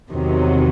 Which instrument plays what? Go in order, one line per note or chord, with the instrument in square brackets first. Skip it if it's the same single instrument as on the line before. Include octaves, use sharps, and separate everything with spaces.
[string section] E2 C3 D#3 F#3